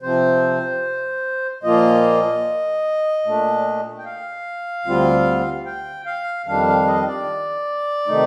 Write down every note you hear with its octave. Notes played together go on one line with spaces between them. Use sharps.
C3 F3 C4 C5
A#2 F3 A#3 F4 D#5
A#2 A3 D4
G5
F5
D2 D3 G3 C4 F4
G5
F5
F2 D#3 G3 D4 F5
F5
D#5
D5
C3 D#3 A3 D#4